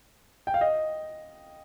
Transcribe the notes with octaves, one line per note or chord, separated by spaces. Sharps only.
G5
F5
D#5